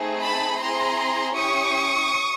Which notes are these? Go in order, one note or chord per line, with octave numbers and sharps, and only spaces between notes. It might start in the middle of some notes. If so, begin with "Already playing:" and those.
Already playing: A3 C4 D#4 G#4
A5 B5
C4 E4 G#4 A#5 C6
C#4 E4 G4 C#6 D#6